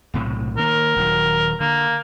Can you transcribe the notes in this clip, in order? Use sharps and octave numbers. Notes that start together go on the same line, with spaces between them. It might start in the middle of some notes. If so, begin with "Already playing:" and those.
B1 A2 C3
D#3 A#3 A#4
D#1 D#3 F#3
D3 A#3